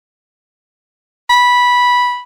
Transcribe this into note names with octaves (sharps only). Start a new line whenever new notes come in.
B5